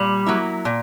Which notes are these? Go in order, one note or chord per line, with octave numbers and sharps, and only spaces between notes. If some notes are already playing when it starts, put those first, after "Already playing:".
Already playing: A#2 G3
F#3 A#3 E4
A#2